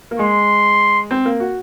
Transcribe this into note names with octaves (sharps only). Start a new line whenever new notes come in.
A#3
G#3 C6
C4
A#3
F#4